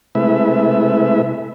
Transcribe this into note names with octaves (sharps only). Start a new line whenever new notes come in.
C3 G#3 A3 E4 B4 E5